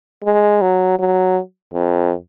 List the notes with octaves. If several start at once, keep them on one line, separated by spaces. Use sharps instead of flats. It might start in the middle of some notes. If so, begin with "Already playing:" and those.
G#3
F#3
F#3
F2